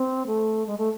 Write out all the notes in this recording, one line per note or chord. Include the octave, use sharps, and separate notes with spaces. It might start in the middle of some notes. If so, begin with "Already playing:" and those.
Already playing: C4
A3
G#3
A3